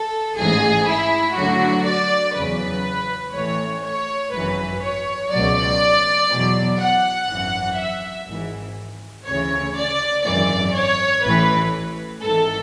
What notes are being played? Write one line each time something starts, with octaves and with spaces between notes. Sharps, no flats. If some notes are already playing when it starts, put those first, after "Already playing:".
Already playing: A4
A1 G#2 E3 G#4
E4
D2 D3 F#3 F#4
D5
E2 C#3 F#3 B4
A1 A2 E3 C#5
C#5
G#1 F#2 E3 B4
C#5
C#2 B2 F#3 D5
E2 B2 F#3
F#5
G#1 F#2 E3
E5
G#1 G#2 E3
D2 C#3 E3 C#5
D5
G#1 F#2 E3 D5
C#5
A1 A2 E3 B4
G#1 G#2 E3 A4